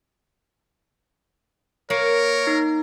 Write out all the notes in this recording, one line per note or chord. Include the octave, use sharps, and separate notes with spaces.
A#3 A#4 C#5
D#4